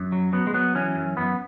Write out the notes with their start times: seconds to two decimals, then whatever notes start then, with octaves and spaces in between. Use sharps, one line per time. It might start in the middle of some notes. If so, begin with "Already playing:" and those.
Already playing: F#2
0.12 F#3
0.33 F#3 B3
0.47 G#3
0.54 F#3 B3
0.75 E3 C#4
0.96 F#2
1.17 F#2 B3